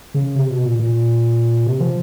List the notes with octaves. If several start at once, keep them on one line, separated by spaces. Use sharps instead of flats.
C#3
C3
B2
A#2
A#2
C3
F3